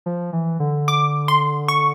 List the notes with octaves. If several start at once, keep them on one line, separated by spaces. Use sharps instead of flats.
F3
E3
D3
D6
C6
C#6